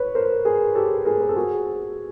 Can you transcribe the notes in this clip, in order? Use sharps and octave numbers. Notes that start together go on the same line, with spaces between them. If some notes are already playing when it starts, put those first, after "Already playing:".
Already playing: B4 C#5
A#4 C5
G#4 A#4
G4 A4
G#4 A#4
A#4
A4
F#4 G#4